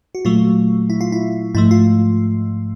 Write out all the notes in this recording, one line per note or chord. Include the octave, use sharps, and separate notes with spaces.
F#4
A#2 F#3 A3 F4
E4
F4
E4
G#2 F3 A3 E4
F4